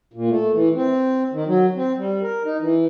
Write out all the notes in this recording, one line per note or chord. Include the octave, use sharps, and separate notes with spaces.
A#2
A3
E3
C4
D#3
F#3
C4
G3
A#4
D#4
E3